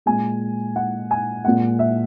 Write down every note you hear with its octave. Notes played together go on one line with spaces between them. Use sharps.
A#2 G#3 G#5
F#5
G#5
A#2 G#3 F#5
E5